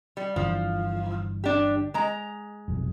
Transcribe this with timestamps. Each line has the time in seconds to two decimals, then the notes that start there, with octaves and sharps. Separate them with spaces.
0.17 G3
0.36 G1 D3 E3 F3
1.44 D4 G4
1.94 G#3 A#5
2.68 F1 B1 F2